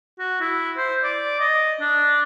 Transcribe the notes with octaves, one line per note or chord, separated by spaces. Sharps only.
F#4
E4
C5
D5
D#5
D4